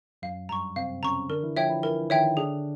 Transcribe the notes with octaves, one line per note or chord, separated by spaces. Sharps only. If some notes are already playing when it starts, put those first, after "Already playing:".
F#2 F#3 F5
G2 G3 A#5 C#6
C3 C4 F5
C#3 C#4 A#5 C#6
D3 D4 A#4
E3 E4
F3 F4 C#5 E5 G5
E3 E4
E3 E4 A#4
D#3 D#4 C#5 E5 G5
D3 D4 G#4